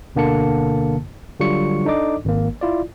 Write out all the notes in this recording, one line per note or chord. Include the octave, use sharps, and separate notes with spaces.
D2 B2 D3 A#3 A5 C#7
D3 F#3 G3 F4 C#6 C#7
D4 D#4 A4 D5 D#5 D6
G#1 A#3
E4 F4 D5